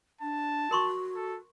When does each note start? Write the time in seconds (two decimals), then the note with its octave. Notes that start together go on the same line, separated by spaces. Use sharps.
0.21 D4 A5
0.71 F#4 A#4 C6 C#6
1.15 A4